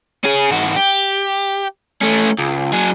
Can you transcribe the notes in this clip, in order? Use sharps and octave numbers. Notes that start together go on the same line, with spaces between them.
C#4 G#4
G#2 F#4
G4
A3 C#4
C#2
F#3 G#4